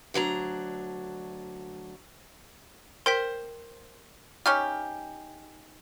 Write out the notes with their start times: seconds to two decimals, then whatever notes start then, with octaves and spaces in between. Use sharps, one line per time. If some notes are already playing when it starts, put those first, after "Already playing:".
0.14 D2 F#3 D4 A#5
3.06 A#4 C5 G5 B6
4.46 C#4 D#4 G4 F6